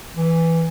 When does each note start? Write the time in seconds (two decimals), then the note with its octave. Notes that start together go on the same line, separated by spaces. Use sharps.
0.17 E3